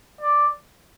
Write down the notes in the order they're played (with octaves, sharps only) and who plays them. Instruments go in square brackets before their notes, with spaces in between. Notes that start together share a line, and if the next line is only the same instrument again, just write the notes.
[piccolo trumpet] D5